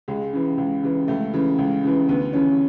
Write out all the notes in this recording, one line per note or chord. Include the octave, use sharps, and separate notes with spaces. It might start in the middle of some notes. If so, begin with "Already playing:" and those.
C#2 G#3
C#3 E3
C#2
C#3 E3
C#2 A3
C#3 E3
C#2
C#3 E3
D2 B3
C#3 E3 C#4